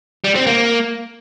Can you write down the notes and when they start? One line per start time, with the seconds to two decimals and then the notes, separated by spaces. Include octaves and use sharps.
0.24 G3
0.35 C4
0.47 A#3